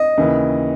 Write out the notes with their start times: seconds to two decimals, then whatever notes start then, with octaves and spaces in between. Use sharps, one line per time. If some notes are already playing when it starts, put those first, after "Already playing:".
Already playing: D#5
0.18 D#2 C#3 E3